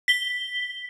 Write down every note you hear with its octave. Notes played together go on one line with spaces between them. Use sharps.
B6 G7